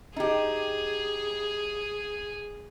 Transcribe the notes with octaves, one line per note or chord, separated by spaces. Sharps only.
D#4 G4 G#4